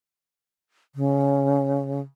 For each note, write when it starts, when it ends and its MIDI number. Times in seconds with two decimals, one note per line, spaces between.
0.95 2.01 49